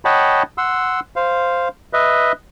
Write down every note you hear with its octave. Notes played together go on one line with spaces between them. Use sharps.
C#5 D#5 F#5 G5 A5 B5
F#5 C6 E6
C5 F5
B4 D#5 E5